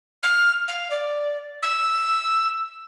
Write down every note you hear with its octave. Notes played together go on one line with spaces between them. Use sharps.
F6
F5
D5
E6